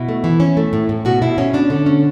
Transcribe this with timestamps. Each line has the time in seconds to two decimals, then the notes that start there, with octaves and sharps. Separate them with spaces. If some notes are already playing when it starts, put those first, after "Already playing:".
Already playing: B2 E4
0.09 A3
0.24 E3
0.40 C#4
0.57 A3
0.73 A2
0.89 A2
1.05 B2 F#4
1.22 B2 E4
1.38 B2 C#4
1.53 C#4 D4
1.70 D3
1.86 C#4